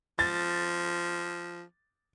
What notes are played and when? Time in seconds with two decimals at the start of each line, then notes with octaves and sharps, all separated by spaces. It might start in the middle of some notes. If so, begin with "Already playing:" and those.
0.19 F3 A6